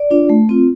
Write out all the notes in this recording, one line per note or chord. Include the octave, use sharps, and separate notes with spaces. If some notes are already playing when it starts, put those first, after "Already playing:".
Already playing: D5
D4 F4
A3
C4 F4